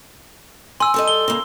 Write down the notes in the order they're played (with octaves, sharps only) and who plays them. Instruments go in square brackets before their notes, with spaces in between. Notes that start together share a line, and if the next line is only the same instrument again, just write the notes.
[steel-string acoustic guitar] G#5 [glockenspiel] C6 E6
[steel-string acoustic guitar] G3 A4 D#5
[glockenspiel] G7
[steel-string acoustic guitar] C#3 A#3